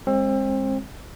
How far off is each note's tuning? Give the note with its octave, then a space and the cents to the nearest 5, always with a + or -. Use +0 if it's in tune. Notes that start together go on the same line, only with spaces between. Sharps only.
G#3 -20 C4 +30